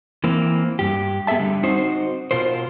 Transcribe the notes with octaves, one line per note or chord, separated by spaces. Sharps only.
E3 A#3 C4
G2 G4
B3 G#4 A4 E5 A5
D3 G3
C4 D#4 F#4 C5
B2 F4 A#4 C5